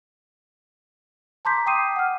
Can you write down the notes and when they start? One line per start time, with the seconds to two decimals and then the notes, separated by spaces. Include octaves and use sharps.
1.45 A5 A#5 C6 D6 G6 B6
1.66 G5 D6 D#6 C7 D#7
1.96 F#5 F6